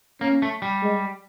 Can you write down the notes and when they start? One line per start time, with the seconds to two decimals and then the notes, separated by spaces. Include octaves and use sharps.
0.21 A#3 C#4
0.42 A3
0.62 G3
0.82 G#3